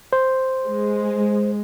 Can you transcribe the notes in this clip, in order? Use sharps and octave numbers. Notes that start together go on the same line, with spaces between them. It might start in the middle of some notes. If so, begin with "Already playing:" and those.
C5
G#3